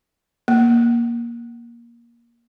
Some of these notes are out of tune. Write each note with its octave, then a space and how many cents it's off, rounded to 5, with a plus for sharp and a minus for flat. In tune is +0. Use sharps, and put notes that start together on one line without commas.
A#3 +15